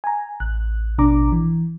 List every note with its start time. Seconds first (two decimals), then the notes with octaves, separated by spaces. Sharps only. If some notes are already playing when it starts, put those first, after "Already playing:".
0.04 G#5 A#5
0.40 A1 F#6
0.98 A1 B2 D4 A#5 D6
1.32 E3